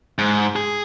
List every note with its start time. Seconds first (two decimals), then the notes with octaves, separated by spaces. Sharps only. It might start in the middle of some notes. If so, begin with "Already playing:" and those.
0.18 G#2
0.56 G#4